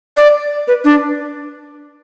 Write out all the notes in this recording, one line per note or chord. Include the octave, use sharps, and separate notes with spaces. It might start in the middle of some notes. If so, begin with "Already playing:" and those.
D5
B4
D4